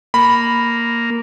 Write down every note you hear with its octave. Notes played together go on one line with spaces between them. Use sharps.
A#3 B5